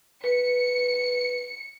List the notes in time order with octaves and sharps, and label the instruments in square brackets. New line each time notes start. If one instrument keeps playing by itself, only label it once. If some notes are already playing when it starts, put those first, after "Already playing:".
[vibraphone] B4 [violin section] C#7